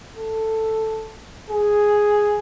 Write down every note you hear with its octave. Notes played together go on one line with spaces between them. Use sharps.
A4
G#4